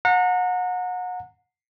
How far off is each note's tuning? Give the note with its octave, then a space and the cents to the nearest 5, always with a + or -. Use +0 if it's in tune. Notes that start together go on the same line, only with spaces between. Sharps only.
F#5 -30 A#5 -30